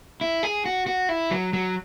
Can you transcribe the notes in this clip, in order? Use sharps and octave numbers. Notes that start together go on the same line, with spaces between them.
E4
G#4
F#4
F#4
E4
F#3
F#3